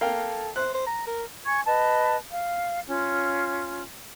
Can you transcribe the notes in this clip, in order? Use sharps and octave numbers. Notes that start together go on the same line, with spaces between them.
A#3 A4 F5 G5
C5 F#6
C5
A#5
A#4
G#5 C#6 G#6
B4 D#5 A5
F5
C#4 F4